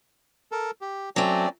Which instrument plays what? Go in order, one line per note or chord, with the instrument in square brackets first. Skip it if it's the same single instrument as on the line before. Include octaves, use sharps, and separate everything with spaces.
[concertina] A4 A#4
G4
[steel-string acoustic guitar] F#3 A3 [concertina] C4 C#4 D5